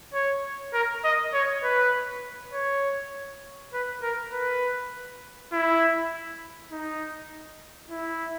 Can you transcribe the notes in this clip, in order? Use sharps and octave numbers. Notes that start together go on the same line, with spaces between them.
C#5
A#4
D#5
C#5
B4
C#5
B4
A#4
B4
E4
D#4
E4